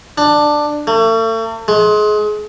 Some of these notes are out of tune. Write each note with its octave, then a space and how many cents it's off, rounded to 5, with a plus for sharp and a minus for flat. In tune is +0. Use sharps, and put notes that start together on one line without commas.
D4 +10
A3 +40
G#3 +30